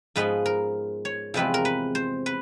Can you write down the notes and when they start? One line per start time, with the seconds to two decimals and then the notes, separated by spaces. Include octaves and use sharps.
0.16 G#2 F3 G#3 B3 B4
0.46 A#4
1.05 C#5
1.34 E2 C3 F3 G#3 C4 B4
1.54 A#4
1.65 B4
1.95 C5
2.26 B4